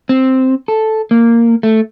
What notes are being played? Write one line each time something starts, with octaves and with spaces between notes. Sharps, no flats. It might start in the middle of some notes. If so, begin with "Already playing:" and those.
C4
A4
A#3
A3